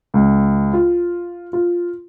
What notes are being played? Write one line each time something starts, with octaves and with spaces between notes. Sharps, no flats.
C#2
F4
F4